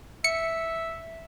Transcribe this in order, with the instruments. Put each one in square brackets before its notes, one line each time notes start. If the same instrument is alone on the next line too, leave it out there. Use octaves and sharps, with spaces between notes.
[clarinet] E5 [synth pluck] C#7